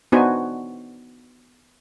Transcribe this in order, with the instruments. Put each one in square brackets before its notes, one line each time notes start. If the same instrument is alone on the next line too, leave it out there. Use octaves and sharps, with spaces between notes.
[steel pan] B3 D4 D#4 F#4 C5 G#5